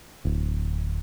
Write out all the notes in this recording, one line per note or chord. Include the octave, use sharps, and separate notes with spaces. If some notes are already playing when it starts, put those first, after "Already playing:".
D1